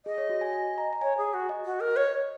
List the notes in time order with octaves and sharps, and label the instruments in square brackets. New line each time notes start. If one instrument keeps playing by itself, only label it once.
[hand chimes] G#4 [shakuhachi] D#5
[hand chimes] C#5
F#4
G#5
G#5
A#5
A#5
[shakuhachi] C#5 [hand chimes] G#5
[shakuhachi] G#4
F#4
[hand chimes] D#5
[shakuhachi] F#4
A#4
C#5